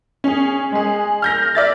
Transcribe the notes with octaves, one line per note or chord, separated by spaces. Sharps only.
C#4 G#4
G#3 G#4
F6 G6 A#6
D5 E5 A6